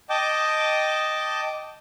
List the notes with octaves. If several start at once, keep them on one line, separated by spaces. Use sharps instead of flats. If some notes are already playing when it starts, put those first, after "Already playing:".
D#5 G5 A5 D6